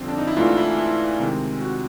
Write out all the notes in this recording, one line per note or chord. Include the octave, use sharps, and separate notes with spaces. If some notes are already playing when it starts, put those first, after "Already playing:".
Already playing: F2 D3 G3 C4 F4
D4
D#4
E4
G#2 E3 A3 D4 F4
E4
E4
C3 D#3 G#3 C4
F#4